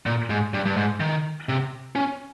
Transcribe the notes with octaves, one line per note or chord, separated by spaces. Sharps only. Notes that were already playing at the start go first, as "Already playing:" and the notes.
A#2
G#2
G2
G2
G#2
D#3
C3
C#4